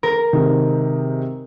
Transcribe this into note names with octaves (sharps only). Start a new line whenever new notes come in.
A#4
C3 D#3 G#3